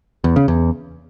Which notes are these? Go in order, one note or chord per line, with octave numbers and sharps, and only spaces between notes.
E2
C#3
E2